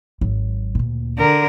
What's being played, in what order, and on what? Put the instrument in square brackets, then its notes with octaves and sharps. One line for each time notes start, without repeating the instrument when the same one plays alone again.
[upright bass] G#1 F#3
D2 A#2
[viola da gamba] D3 A#4